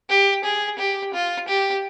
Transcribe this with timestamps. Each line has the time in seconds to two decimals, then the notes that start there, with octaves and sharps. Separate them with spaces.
0.09 G4
0.44 G#4
0.79 G4
1.14 F4
1.48 G4